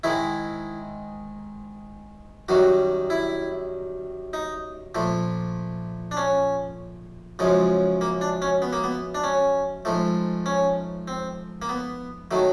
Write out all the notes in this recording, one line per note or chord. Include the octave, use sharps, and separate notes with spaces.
G#2 D#3 G#3 E4
F#2 D#3 G3 F#4
E4
D#4
A#2 F3 A3
D4
C#4
F#2 C#3 F3 G#3
A#3
D4
C#4
B3
A#3
B3
D4
C#4
G#2 F3 A3
C#4
C4
A#3
B3
D#3 F#3 A3